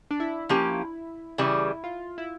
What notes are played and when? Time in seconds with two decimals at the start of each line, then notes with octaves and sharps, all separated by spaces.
0.11 D4
0.20 E4
0.49 F3 A#3 C#4 E4 G4
1.38 C#3 E3 G3 E4
1.84 F4
2.18 E4